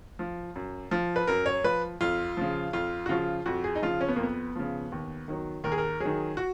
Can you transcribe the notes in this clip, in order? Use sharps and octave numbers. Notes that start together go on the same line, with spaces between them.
F3
F#2
F3
B4
F#2 A#4
C#5
F3 B4
F2 F4
C#3 F3
F2 F4
F#4
C#3 F3 F4
F2 F#4
G#4
D#4
C#3 F3 F4
C#4
B3
A#3
F2 B3
C#3 F3
D#2
D#3 F#3
D#2 A#4
G#4
A#4
D#3 F#3 G#4
F#4